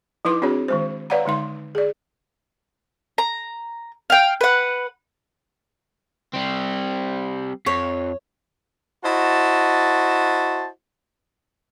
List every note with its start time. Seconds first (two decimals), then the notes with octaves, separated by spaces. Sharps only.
0.25 F3 D#4 E4 B4 C6 D6
0.42 C4 D4 F#4 G#4 C#5
0.68 D#3 G#3 C5
1.10 B4 C#5 D5 F5 F#5 A#5
1.25 D3 G#3 D#4 C6
1.75 G#4 D5
3.18 A#5
4.10 F5 G5
4.41 B4 F#5
6.34 G3 C4
7.66 F2 C#5
9.05 E4 F#4 C5 D#5 A5